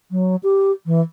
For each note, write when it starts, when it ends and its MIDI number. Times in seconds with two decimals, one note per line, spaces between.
0.11 0.36 54
0.43 0.71 67
0.86 1.01 52